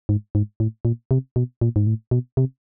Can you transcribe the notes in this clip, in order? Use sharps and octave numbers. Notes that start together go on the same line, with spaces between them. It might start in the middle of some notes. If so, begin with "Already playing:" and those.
G#2
G#2
A2
A#2
C3
B2
A#2
G#2
A2
B2
C3